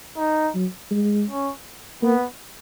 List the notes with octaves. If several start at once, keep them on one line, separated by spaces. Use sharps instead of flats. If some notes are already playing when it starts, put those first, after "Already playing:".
D#4
F#3
G#3
C#4
A#3 B3